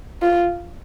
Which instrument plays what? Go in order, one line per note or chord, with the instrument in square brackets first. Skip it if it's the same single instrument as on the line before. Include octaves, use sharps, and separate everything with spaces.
[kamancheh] F4